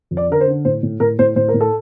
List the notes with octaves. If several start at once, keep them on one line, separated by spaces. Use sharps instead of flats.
F2
D5
D3 A#4
C5
D3
A2 C5
A2
A2 A#4
A2 C5
A2 C5
A#4
A2
A4